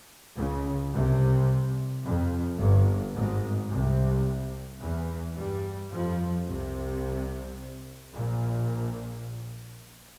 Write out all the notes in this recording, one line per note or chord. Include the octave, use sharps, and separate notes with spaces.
C#2 C#3
C2 C3
F2
G1 G2
G#1 G#2
C2 C3
E2 E3
G2 G3
F2 F3
C2 C3
A#1 A#2